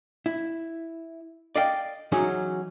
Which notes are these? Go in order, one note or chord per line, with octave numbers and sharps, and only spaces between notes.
E4
D5 D#5 F5 G5
E3 F#3 C#4 D#4 F#4 G#4